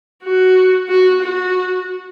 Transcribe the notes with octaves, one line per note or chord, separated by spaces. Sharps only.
F#4
F#4
F#4